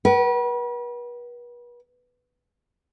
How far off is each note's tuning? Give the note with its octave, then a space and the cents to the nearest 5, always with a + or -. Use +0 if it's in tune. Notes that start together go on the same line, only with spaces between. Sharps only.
B4 -40 F#5 +45